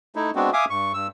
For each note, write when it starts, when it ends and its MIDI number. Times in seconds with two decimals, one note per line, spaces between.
0.16 0.31 57
0.16 0.31 63
0.16 0.31 64
0.35 0.50 56
0.35 0.50 59
0.35 0.50 60
0.35 0.50 62
0.35 0.50 66
0.53 0.65 76
0.53 0.65 77
0.53 0.65 80
0.53 0.65 86
0.53 0.65 87
0.70 0.92 43
0.70 0.92 85
0.94 1.07 43
0.94 1.07 88